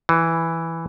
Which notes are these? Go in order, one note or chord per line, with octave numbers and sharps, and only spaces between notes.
E3